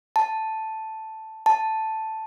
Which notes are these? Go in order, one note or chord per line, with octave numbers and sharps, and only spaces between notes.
A5
A5